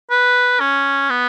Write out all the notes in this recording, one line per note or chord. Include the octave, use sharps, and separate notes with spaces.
B4
C#4
B3